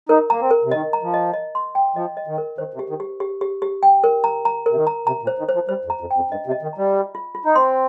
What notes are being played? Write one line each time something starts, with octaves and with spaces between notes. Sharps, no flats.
D#4 A#4
A#3 A#5
C4
A#4
C3
D#3 D#5
A#5
F3
D#5
D#5
C6
G5
F3 D#5
D#5
D#3
A#4
D#3 C5
C3
G4
D#3
G4
G4
G4
G4
G5
A#4
A#5
A#5
C3 A#4
D#3
A#5
C3 A#5
A#2
C5
D#3
C5
F3
G3 C5
F2
A#5
F2
G5
F2
G2 D#5
C3
D#5
D#3
G3 A#5
F4
F4
F4
D#4
C4 C6